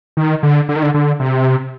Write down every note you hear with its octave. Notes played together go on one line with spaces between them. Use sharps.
D#3
D3
D3
D#3
D3
D3
C3